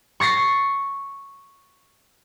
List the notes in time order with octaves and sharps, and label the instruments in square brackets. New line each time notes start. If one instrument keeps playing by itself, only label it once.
[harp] C#6 A6 A#6 C7